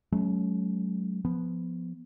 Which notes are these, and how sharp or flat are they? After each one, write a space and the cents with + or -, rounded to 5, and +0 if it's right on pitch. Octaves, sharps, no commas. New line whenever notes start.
F#3 +15 A3 -45 C#4 +0
F3 +0 B3 +0